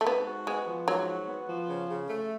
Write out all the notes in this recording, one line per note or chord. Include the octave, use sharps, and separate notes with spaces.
A3
G#2 B3
F#4
G#3 B3
F3
G#2 F#3
F#4
B3
F3
C#3
C#3
A3